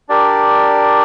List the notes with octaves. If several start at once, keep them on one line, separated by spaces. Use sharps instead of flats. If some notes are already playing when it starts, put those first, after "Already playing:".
D4 G4 A#4 D5